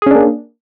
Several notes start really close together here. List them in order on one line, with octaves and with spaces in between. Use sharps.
G#4 C#4 D4 A#3